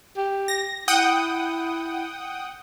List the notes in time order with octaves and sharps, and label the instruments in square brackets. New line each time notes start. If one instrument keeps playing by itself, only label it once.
[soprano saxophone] G4
[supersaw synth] A#6
[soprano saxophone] E4 [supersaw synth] F#5 G5 D#6